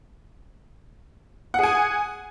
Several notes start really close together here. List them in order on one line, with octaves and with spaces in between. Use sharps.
F#5 G#4 G#5